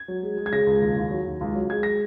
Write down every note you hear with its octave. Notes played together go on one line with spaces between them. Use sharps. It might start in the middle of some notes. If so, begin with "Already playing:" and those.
Already playing: G#6
F#3
G#3
G#3
G#6
C#3 A#6
C#2
D#2
D#2
F#3
D#2
C#2
F#3
G#3 G#6
A#6